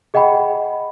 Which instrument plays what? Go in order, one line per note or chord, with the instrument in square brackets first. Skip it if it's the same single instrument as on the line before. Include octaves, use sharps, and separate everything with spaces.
[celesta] G#4 D#5 F#5 G5 B5